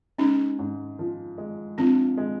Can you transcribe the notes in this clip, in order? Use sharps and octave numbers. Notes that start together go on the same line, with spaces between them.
G#3 C#4 D#4
G#2
F3
G#3
F3 C4 D4
G#3